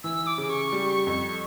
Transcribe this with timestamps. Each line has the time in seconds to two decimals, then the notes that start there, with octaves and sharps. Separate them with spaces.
0.04 E3 E6
0.27 D6
0.38 C#3
0.50 C#6
0.72 G3
1.07 F2